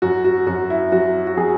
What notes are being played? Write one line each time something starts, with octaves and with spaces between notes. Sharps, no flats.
F#2 F#4
F#4
F#2 F#4
E4
F#3 F#4
F#4
F#3 G#4